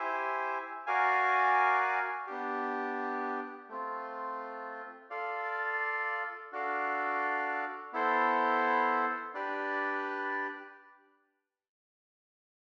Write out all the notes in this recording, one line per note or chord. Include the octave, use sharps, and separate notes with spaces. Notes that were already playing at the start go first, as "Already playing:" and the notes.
Already playing: E4 G4 C5 E5 G#5
F#4 A#4 D5 F5 G#5
B3 D4 G4
A3 C4 F4
F4 A4 D5 F5
D4 F#4 A4 D5 F5
B3 E4 A4 C5
D4 G4 B4 D5